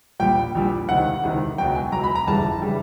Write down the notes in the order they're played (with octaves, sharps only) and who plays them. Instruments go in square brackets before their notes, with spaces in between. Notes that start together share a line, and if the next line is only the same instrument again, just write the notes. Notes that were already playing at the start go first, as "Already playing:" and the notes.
[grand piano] A#1 A#2 G3 G5
A#1 A#2 G3
C#2 C3 D#3 F#5
C#2 C3 D#3
C#2 B2 F#3 G5
G#5
C#2 B2 F#3 A#5
B5
A#5
G1 F2 C#3 E3 G3 A5
C#3 E3 G3